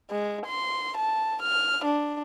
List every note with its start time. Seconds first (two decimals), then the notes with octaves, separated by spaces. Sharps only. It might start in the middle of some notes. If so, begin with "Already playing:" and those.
0.11 G#3
0.46 C6
0.97 A5
1.42 F6
1.85 D4